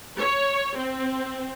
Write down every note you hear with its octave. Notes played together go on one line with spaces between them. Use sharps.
C#5
C4